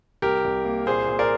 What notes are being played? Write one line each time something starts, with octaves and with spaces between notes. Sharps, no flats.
C2 G4 A#4
C2
A#3
A#2 G#4 C5
A#2
A#4 D5